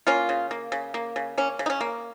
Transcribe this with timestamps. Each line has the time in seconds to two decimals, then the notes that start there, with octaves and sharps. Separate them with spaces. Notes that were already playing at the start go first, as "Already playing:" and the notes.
0.07 A#3 C#4 F4
0.29 C#3
0.51 A#3
0.72 C#3
0.94 A#3
1.16 C#3
1.38 A#3 C#4
1.59 C#3
1.66 D#4
1.70 C#4
1.80 A#3